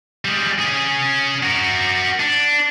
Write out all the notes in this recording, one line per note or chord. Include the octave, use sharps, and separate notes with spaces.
G3 G#3
C#4 G#4
F#4 A#4
D4